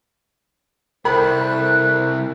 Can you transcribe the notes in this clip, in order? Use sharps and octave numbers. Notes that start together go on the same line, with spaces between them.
C2 A4 A#4 C5 B5 F#6